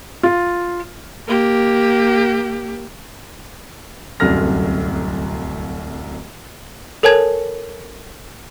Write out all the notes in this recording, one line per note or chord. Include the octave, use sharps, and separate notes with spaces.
F4
A#3 G4
D1 C2 F#2 A4 F6 A#6
A4 A#4 C#5 G#5 A5 G#6